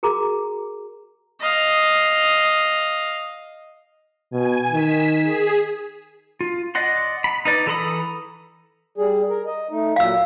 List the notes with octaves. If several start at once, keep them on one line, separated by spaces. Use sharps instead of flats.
F#4 G#4 A#4 A#5 D6
D#5 F5
B2 G#5
D#3 B6 E7
G#4
F4
D5 D#5 F#5 C6
B5
D#4 B4 D5
E3 A4 A#5 B5 D#6
G3 G#4
A#4
D#5
A3 D#4
A#2 F#3 F5 E6